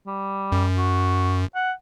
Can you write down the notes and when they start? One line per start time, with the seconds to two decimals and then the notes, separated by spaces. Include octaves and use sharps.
0.07 G3
0.52 F#2
0.77 F#4
1.55 F#5